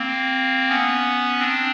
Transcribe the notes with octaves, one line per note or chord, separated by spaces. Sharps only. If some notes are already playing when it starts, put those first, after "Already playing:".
Already playing: A#3 C4
B3 C#4
C4 D4